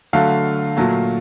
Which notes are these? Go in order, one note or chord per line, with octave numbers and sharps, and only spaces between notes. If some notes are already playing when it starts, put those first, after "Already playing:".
D3 F#3 A3 F5
A#2 F#3 A3